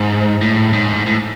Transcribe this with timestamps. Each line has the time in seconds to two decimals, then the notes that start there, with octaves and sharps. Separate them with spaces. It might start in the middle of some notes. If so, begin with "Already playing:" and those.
Already playing: G#2
0.41 A2
0.73 G#2
1.06 A2